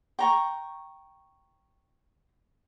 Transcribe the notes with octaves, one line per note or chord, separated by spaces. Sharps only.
G5 A#5 C#6